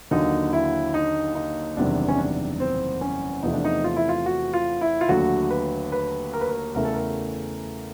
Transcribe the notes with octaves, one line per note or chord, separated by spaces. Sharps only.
D#2 D3 F#3 A#3 D#4
E4
D#4
D#4
F#1 E2 C3 D#3 G3 D4
C#4
D4
C4
C#4
E2 C3 F3 A3 D#4
D4
D#4
F4
E4
F4
F#4
F4
E4
F4
D#2 D3 F#3 A3 F#4
B4
B4
A#4
B4
A#4
E2 C#3 E3 A3 A#4
A4
A#4